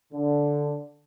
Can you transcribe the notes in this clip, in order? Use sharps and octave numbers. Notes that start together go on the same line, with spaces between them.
D3